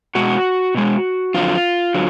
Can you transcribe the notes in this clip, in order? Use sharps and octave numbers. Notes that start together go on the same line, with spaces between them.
B2 G#3 F#4
B2 G#3
F2 D3 F#3 F4
D3 F#3